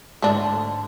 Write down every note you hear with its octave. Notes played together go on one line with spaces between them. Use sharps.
G#2 D3 A3 D4